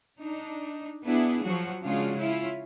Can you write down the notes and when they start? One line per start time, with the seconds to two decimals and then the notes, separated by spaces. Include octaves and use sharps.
0.20 D4 D#4
1.05 B3 D4 E4 G#4
1.43 F3 F#3 F#4
1.83 C#3 G#3 D4 F4 F#4 G#4
2.17 C#4 E4 F4